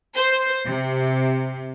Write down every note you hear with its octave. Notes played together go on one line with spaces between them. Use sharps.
C5
C3